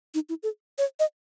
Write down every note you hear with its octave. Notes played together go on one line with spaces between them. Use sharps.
D#4
E4
A4
C#5
D#5